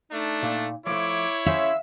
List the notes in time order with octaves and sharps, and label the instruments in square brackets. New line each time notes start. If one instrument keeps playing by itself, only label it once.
[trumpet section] A3 D4 [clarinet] D#4
[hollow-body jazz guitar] A#2
[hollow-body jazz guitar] F3 A3 [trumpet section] E4 C#5 [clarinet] D6
[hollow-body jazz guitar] C#4 G#4 C5 [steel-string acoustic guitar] E5 [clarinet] F5